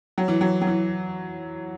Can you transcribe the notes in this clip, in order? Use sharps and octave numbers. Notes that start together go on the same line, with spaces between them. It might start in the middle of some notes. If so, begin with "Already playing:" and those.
F#3
E3
F#3
F#3
E3